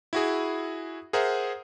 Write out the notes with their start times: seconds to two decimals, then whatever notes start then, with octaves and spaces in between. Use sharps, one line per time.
0.13 E4 F#4 G#4
1.13 G#4 A#4 C5 E5 F#5